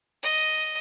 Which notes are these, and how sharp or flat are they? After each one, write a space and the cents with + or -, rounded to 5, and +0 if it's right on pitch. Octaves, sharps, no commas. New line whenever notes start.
D#5 +0